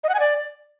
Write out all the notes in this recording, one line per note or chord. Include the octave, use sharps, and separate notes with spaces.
D#5
F#5
G#5
D5